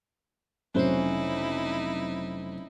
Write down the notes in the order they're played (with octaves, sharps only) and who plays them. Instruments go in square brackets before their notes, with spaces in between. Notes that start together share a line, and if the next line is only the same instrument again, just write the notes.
[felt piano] F1 C5 [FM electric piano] F#3 C4 [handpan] C#4 [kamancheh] D#4 E4